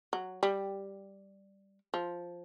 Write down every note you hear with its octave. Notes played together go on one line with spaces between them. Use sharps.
F#3
G3
F3